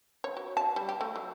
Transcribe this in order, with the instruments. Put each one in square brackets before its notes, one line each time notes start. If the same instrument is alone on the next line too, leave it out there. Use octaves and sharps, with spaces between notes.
[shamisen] C#5
F#4
A5
G3
G4
A3
F#3